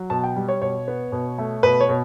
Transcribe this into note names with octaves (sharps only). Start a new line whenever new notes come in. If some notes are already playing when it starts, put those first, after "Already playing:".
Already playing: F#3
B2 A5
G5
G3
C#5
B2 C#5
B3
B2
A3
B2 B4
C#5
B2